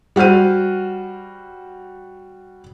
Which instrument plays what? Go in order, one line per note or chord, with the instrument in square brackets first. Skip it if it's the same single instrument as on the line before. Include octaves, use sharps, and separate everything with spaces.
[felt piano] G3 F#4 C5 F6 D#7